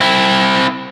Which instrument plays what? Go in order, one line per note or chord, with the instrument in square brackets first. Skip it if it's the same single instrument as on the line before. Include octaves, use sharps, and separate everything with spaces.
[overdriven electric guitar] C4 E4